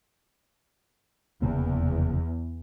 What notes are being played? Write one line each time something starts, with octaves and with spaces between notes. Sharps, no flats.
F1 E2 C#3 A#3